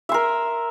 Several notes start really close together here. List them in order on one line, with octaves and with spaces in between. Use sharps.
E5 C6 A#4